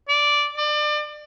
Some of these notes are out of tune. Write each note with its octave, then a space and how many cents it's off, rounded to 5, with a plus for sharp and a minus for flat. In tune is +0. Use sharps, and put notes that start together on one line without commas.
D5 -5
D5 +30